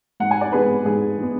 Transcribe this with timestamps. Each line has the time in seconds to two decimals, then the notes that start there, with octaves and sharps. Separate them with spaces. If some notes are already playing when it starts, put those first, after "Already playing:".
0.20 G#2 F#5
0.31 G#5
0.41 D5 F#5
0.52 G#3 B3 G#4 B4
0.85 G#2 G#4
1.19 G#3 B3